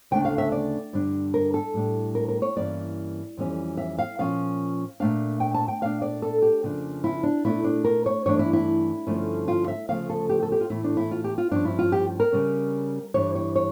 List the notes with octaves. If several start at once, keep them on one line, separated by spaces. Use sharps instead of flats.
D2 C#3 F3 A3 D4 G5
F5
E5
D5
G2 D3 G3 D4
A#4
A4
A2 G3 D4
A#4
A#4
C#5
G2 E3 A#3 C#4 D5
F2 E3 G3 C#4
E5
F5
A#2 F3 C#4 F5
A#2 A3 D4 F5
G5
A5
G5
A#2 A3 D4 F5
D5
A4
G4
F2 C#3 F3 A#3 D4
E4
D4
A#2 A3 D4 E4
D4
A#4
C#5
G2 E3 A3 D4 C#5
E4
E4
G2 D3 F3 A3 C#4
F4
E5
D2 C#3 F3 A3 F5
A4
G4
A4
G4
F4
A2 E3 A3 E4
D4
E4
F4
G4
F4
G2 F3 C#4 D4
E4
F4
G4
A#4
C#3 G3 C#4
G2 E3 G3 D4 C#5
C#5
C#5